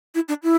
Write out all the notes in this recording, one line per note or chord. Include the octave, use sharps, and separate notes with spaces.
E4
D4
E4